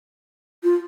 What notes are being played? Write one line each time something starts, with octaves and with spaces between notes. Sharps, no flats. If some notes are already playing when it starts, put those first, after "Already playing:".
F4